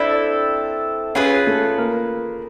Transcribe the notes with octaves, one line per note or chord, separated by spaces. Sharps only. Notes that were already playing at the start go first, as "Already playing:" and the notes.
Already playing: C4 D4 E4 A4 D5
C#4 F4 G#4 B4 C#5
A3 A4
A#3 A#4